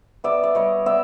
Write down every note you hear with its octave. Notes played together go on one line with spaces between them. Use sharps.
B3 D5 E5
D5
G3 C#5 D#5
B3 D5 E5